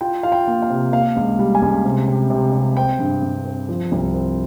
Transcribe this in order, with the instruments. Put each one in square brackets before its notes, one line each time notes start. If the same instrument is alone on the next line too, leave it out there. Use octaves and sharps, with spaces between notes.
[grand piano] F4 G5
F4 F5
G5
A#3
F5
C3
A#3 F5
C#2
G3
G#5
C#2
C3
C3
C3
C3
C4 G5
G2
G2
C4
F3
C2
C4